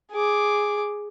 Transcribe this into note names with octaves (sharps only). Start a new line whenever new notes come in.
G#4 D6